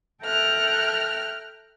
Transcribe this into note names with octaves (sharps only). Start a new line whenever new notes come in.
A4 E5 G5 A#5 F6 F#6